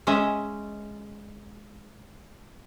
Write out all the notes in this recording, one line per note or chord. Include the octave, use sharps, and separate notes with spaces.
G#3 C#4 D#5 E5